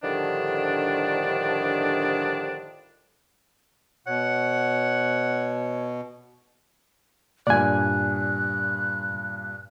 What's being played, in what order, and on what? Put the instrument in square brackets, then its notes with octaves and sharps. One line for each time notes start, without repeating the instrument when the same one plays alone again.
[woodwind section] A2 D3 D#3 F3 G3 D4
[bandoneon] B2 [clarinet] C#5 [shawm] F#5
[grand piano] G2 A#2 [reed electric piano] D5 G#5 [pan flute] F#6